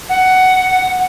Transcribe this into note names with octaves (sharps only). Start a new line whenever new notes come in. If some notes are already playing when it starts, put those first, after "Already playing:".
F#5